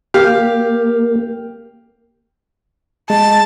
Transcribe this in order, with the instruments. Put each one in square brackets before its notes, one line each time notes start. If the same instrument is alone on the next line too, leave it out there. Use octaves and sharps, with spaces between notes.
[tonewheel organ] A#3 [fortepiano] G4 F5
[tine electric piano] G#3 [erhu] A5